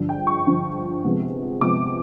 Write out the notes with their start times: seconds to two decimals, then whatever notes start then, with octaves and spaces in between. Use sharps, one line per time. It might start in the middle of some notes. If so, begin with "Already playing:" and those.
Already playing: G2 D3 F3
0.09 G5
0.27 C#6
0.46 G2 D3 F3
1.04 C3 F3 G#3 B3
1.61 C3 F3 G#3 B3 D6